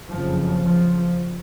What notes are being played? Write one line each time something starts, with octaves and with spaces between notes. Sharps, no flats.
F#1 F2 C#3 F3
F3